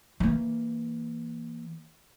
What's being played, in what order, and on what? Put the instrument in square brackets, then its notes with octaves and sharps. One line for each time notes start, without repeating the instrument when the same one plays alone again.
[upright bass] E3 A#3